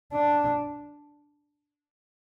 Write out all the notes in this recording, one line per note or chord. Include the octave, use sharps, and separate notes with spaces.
D4